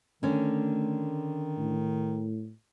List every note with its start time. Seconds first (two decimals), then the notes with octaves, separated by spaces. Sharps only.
0.23 D3 D#3 A3 C#4
1.57 A2